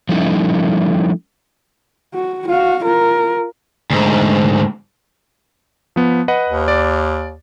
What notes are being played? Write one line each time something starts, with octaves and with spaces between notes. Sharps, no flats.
F3 G3 A3 C#4 D#4 E4
F#4
F#4 F5
F4 A#4
D2 G#2
F3 B3
B4 D#5 F#5
D#2
D5